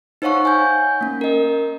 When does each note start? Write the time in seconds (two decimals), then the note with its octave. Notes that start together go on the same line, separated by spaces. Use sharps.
0.22 D#4 C5 C#5 F5 F#5 C#6
0.45 G#5 G6
1.01 A#3 C#4
1.21 A#4 D#5